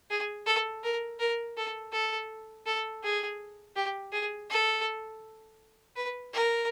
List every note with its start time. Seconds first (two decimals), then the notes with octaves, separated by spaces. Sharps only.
0.10 G#4
0.46 A4
0.84 A#4
1.20 A#4
1.57 A4
1.92 A4
2.66 A4
3.03 G#4
3.76 G4
4.12 G#4
4.50 A4
5.96 B4
6.33 A#4